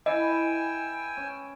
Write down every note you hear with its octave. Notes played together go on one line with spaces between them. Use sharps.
E3 D#5 G5 G#5 E6
C#4